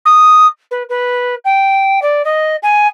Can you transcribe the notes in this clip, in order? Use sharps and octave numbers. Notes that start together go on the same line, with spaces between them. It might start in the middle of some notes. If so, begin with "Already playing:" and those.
D#6
B4
B4
G5
D5
D#5
G#5